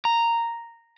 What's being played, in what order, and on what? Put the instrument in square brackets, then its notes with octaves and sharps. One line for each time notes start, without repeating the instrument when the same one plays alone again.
[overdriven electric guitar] A#5